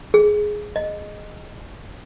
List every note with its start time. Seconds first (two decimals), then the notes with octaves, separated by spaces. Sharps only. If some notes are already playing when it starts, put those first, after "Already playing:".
0.14 G#4
0.76 D#5